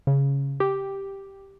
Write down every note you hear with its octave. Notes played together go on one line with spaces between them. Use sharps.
C#3
G4